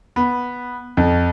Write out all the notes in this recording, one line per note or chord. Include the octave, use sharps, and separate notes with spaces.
B3
F2